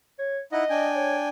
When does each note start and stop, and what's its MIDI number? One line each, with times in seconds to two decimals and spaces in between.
0.19 0.39 73
0.52 0.64 63
0.52 0.64 64
0.52 0.88 75
0.52 0.64 78
0.70 1.29 62
0.70 1.29 79
0.70 1.29 80
0.95 1.16 73